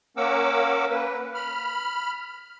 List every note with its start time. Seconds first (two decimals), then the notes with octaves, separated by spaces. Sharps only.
0.17 A#3 C#4 A#4 F#5 D6 E6
0.89 A#3 B4
1.34 B5 F6